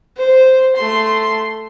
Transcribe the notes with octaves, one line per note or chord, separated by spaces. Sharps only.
C5
A3 C6